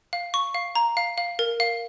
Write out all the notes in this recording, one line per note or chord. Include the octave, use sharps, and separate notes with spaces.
F5
C#6
F5
A#5
F5
F5
A#4
F5